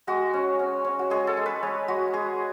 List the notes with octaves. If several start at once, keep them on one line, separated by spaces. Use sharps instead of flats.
G#3 F#4
C#4
C#4
C#4
F#4
G#3 G#4
A4
G#3
B4
G#3 C#5
G#3 F#4
G#3 G#4